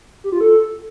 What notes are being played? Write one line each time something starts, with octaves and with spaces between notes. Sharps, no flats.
G4
F4
A4